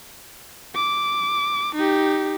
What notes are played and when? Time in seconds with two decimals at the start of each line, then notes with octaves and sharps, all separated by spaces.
0.75 D6
1.76 D#4 G4